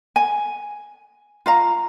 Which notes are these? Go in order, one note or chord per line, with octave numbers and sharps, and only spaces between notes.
G#5
F4 F5 A#5